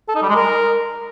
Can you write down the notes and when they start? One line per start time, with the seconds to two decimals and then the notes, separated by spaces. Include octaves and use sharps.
0.08 A4
0.15 D#4
0.22 G3
0.29 G#3
0.36 A#4